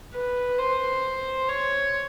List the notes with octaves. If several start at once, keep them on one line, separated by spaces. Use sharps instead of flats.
B4
C5
C#5